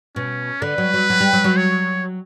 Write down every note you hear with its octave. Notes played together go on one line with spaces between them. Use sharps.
B2 C#4
D3 B4
F#3
F#3
F#3
G3
F#3
F#3
C#5